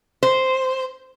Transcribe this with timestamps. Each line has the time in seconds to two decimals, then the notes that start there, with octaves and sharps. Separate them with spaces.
0.23 C5